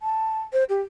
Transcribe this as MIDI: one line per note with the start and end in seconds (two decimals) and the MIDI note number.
0.01 0.41 81
0.53 0.64 72
0.69 0.81 67